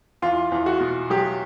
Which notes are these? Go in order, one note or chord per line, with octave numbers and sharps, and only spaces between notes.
E2 F4
E2
F#4
B2
F#3 G4